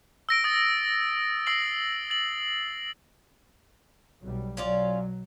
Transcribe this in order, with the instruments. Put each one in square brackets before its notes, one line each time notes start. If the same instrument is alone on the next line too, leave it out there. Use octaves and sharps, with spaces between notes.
[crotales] E6 A#6 D7
D#6 A6
D#6 E6 C7 F#7
A6 F#7
[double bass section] B1 F#3 G3
[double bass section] B2 F#3 [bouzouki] C#4 F4 D5